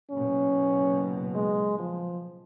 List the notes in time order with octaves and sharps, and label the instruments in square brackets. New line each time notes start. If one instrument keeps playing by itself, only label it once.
[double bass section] F#1 B2 [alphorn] C#4
[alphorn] G#3
F3